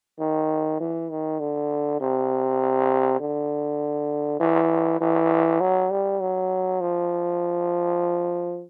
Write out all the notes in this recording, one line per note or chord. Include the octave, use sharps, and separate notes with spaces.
D#3
E3
D#3
D3
C3
D3
E3
E3
F#3
G3
F#3
F3